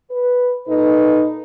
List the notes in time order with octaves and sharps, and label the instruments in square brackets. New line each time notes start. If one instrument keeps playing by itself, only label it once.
[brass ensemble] B4
A#2 D#4 A4 B4